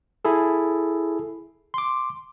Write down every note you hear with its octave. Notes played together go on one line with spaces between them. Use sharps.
E4 G#4 A4
C6 D6